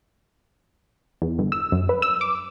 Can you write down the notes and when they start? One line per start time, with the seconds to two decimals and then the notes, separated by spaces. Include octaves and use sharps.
1.22 E2
1.38 G1
1.52 E6
1.72 F#2
1.89 B4
2.02 E6
2.21 D6